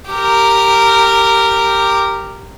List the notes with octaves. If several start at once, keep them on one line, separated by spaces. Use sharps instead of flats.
G4 A#4